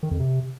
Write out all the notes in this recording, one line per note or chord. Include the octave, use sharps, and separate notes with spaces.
D#3
F2
C3